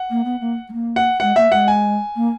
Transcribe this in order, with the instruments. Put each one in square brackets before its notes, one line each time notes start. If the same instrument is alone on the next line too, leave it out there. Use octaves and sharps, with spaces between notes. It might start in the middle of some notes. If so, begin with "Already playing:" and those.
Already playing: [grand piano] F#5
[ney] A#3
B3
A#3
G#3
A#3
[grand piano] F#5
[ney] G#3 [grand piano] F#5
[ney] A#3 [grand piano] E5
[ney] G#3 [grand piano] F#5
[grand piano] G#5
[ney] A#3